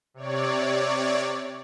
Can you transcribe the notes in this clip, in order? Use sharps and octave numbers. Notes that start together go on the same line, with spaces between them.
C3 C#5 D5